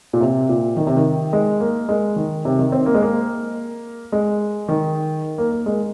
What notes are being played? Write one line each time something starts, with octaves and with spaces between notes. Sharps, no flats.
A#2
C3
A#2
D#3
C3
D#3
G#3
A#3
G#3
D#3
C3
D#3
C4
A#3
G#3
A#3
G#3
D#3
A#3
A#3
G#3